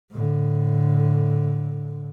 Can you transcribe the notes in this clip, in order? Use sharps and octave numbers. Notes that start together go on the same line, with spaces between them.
A2 D3